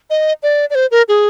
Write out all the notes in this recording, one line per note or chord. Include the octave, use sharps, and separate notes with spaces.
D#5
D5
D5
C5
A#4
G#4